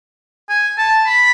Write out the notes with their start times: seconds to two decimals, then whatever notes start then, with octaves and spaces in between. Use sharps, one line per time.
0.49 G#5
0.78 A5
1.06 B5